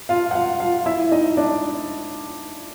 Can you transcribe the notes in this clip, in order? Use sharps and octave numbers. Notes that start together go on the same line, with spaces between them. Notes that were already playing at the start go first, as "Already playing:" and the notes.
F4 F5
F#5
F4 F5
F4 F5
E4 E5
D#4 D#5
D4 D5